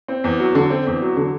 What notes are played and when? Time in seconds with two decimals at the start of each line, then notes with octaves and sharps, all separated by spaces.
0.08 C4
0.24 E2
0.40 F#3
0.55 D3
0.70 C4
0.87 E2
1.02 F#3
1.17 D3